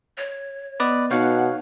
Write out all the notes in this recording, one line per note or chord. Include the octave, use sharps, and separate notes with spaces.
C#5
B3 B4 D5 D#5
B2 D#4 C#5 F5 F#5